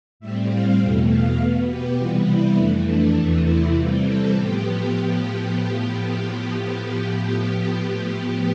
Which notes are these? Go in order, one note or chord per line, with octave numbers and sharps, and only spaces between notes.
A2 G3 C4 E5
F5
E2 B2 A3 G5
F5
B2 B3
G4
C3 E3 G3 B3 F4
E4
F2 E3 A3 D4
D4
E2 C3 E3 A3
E4
C3 E3 G3 C4 F4
A4
A2 F3 B3 G4